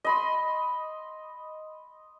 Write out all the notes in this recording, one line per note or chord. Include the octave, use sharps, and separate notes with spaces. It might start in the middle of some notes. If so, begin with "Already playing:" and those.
D#5 B5 C6